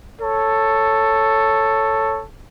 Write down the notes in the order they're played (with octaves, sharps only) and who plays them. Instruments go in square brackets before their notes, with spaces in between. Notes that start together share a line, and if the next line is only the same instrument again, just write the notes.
[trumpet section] A4 C#5